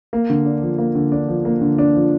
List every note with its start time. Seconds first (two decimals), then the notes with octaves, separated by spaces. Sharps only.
0.13 A#3
0.30 D3
0.46 D4
0.62 F3
0.78 A#3
0.95 D3
1.12 D4
1.28 F3
1.45 A#3
1.61 D3
1.78 D4
1.95 F3